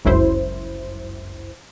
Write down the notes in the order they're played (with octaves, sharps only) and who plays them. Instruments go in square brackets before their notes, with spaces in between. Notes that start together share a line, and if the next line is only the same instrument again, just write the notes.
[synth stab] G1 C#2 F#2 E4 C5